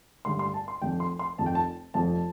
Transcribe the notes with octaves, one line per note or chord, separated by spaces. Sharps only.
A1 G2 D3 G3 C6
C6
A5
C6
F1 F2 F3 G5
C6
C6
F1 F2 F3 A5
G5
A5
F1 F2 F3 A5